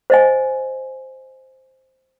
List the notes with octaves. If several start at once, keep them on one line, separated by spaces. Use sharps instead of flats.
C5 D#5 G#5